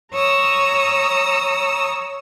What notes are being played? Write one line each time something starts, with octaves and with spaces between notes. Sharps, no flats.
C#5 A#5 D#6 E6